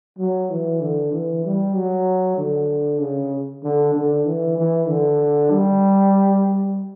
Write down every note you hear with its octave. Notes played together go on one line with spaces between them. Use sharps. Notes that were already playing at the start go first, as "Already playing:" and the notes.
F#3
E3
D3
E3
G3
F#3
D3
C#3
D3
D3
E3
E3
D3
G3